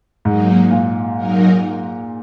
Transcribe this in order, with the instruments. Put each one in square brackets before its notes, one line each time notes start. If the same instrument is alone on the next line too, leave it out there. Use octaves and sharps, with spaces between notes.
[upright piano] G#2 [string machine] F#3 A#3 D#4
[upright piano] A#2
[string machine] F#3 D#4 A#4